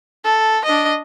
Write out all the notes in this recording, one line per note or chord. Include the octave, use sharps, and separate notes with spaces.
A4
D4 D#5